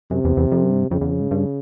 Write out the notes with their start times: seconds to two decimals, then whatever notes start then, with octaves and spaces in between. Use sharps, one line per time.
0.11 F#2 C3
0.24 E2
0.37 E2
0.52 F2
0.62 F#2
0.70 G2
0.91 F2 C#3
1.01 E2
1.11 F2
1.21 G#2
1.31 G2